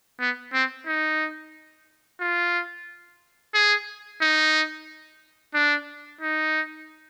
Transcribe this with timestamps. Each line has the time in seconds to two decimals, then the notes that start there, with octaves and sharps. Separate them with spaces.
0.20 B3
0.54 C4
0.87 D#4
2.20 F4
3.54 G#4
4.22 D#4
5.54 D4
6.21 D#4